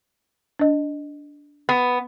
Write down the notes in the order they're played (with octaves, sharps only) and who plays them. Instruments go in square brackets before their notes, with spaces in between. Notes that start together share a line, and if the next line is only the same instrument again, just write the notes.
[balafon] D4 D#5
[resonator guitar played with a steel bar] B3